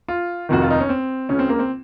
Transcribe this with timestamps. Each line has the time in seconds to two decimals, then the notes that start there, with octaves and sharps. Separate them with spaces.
0.08 F4
0.49 F1 F2 D#3 F#4
0.62 F4
0.70 D#4
0.81 C#4
0.89 C4
1.29 C#2 C#3 C#4
1.39 C4
1.49 A#3
1.59 C4